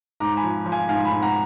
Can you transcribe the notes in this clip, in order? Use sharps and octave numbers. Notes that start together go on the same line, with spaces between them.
G#2 A#5 D6
G#5 B5
F3
F3
F5 G#5
G#2 F5 G#5
G#5 B5
G#2
F#5 A#5